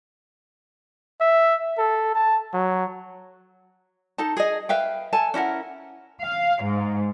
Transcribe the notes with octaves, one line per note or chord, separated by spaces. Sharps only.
E5
A4
A5
F#3
D#4 A4 A5
G#4 D#5
B4 E5 F5 G5
A4 G#5 A5
C#4 E4 A#4 F#5
F5
G#2